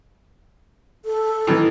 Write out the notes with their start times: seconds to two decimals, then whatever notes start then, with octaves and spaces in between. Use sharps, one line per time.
1.05 A4
1.47 A2 D#3 E3